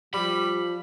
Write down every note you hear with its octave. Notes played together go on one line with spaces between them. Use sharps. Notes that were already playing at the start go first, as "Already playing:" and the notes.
F3 G3 B5